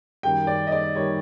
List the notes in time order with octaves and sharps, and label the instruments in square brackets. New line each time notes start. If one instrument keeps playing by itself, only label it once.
[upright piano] F#2 D#3 G3 G5
D5
D#5
D5
D#3 G3 C#5